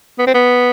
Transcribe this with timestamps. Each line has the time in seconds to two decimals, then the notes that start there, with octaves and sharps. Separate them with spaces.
0.19 B3
0.27 C4
0.35 B3